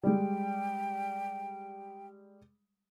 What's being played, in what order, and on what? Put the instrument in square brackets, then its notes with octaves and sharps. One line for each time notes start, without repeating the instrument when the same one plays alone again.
[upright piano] G3 G#3 [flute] G5